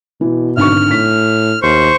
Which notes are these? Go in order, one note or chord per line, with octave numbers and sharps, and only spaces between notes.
B2 E3
G#1 D3 C#6 F6
A2 B6
D#2 C5 C#6